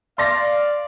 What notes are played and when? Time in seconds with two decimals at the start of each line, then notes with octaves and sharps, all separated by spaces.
0.18 D5 F5 C6 A6 A#6